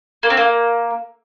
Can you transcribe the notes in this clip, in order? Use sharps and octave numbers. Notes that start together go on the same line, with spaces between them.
A#3
C4
A#3